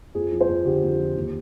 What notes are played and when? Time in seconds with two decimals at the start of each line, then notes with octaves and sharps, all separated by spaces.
0.15 F2 G#4
0.32 F3
0.41 C5
0.49 F2
0.65 D3 G4
0.83 F2
0.99 F3
1.16 D#2